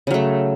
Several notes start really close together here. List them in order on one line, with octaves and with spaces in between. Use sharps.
C#3 F#3 A3